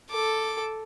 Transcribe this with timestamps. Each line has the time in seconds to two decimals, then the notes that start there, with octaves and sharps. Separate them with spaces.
0.11 A4 D6